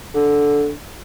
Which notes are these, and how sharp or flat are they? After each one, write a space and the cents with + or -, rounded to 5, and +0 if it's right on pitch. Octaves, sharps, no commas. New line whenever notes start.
D3 -10